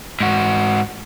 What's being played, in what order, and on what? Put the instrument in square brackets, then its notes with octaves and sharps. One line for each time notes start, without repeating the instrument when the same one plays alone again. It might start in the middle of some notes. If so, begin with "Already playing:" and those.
[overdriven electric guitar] G#2 F#4